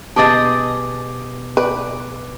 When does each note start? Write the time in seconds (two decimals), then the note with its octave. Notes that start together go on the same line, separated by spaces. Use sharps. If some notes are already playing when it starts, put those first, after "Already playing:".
0.16 B2 G4 G#4 D#5 A5 D6 D#6 A6
1.57 B4 D5